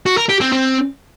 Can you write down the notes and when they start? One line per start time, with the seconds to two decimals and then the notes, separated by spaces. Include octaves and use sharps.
0.06 F#4
0.17 A#4
0.29 G4
0.41 C4
0.52 C4